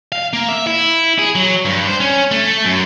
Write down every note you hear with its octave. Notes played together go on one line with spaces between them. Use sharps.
F5
A#3
E5
E4
G#4
F#3
G2
C5
C#4
A3
F#2